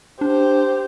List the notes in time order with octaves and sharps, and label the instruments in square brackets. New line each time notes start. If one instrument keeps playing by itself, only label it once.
[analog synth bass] D4 [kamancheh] G4 C5